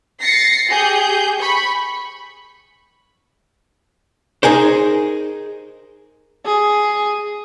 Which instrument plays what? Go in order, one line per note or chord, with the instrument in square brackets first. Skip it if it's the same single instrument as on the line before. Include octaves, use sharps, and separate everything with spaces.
[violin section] A6 A#6 C7 C#7
G4 G#4 G6
B5 C#6
[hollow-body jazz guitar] D#4 G#4 A#4 C5
[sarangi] G#4